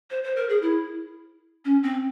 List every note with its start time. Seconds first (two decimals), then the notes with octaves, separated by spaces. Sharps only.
0.11 C5
0.24 C5
0.36 A#4
0.49 G#4
0.62 E4
1.65 C#4
1.83 C4